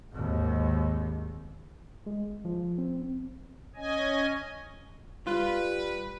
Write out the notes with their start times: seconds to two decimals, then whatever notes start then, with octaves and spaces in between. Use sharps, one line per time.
0.13 G#1 D#2
2.06 G#3
2.45 F3
2.78 C4
3.76 C#4 D#5 G#5
5.27 G3 F4 B4